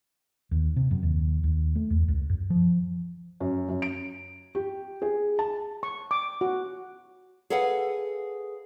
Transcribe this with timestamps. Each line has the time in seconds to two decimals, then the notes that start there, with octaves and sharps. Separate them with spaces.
0.51 D#2
0.76 C3
0.91 F#2
1.03 D#2
1.44 D#2
1.76 A3
1.90 E2
2.08 C#2
2.30 F#2
2.50 F3
3.40 F#2
3.69 F#2
3.82 D7
4.55 G4
5.02 G#4
5.39 A5
5.83 C#6
6.11 D6
6.41 F#4
7.50 G#4 A4 B4 F5 F#5